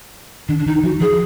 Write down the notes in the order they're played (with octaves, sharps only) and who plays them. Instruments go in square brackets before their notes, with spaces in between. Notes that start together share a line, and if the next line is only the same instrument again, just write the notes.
[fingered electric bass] D#3 [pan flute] D4
[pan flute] D4
[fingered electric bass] D#3 [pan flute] D#4
[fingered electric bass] F3 [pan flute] F#4
[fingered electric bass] F3 [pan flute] G#4